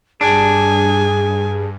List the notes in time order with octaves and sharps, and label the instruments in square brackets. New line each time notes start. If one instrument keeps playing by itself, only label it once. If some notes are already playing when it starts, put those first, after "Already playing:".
[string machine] G2 [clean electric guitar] D4 [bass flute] G#4 [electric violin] G#5